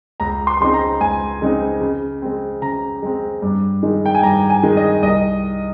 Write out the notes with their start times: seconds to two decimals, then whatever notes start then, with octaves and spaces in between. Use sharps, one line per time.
0.20 C#2 A#5
0.47 C6
0.60 C#3 G#3 C4 D#4 C6
0.74 A#5
1.00 C#2 G#5
1.42 C#3 G#3 C4 D#4
1.81 C#3
2.22 G#3 C4
2.62 C#3 A#5
3.02 G#3 C4
3.42 G2
3.83 D#3 G#3 D#4
4.06 G5
4.15 G#5
4.23 G2 A#5
4.50 G#5
4.63 D#3 G#3 D#4
4.77 D#5
5.03 C2 D#5